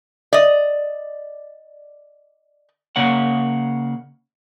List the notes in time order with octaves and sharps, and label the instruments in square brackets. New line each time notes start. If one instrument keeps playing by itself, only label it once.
[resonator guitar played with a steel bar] D5 D#5
[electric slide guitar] C#3 A#3 C#5 F#5